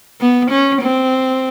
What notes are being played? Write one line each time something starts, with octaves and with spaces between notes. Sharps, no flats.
B3
C#4
C4